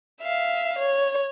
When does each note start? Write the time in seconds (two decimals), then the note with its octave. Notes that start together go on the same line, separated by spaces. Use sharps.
0.22 E5 F5
0.79 C#5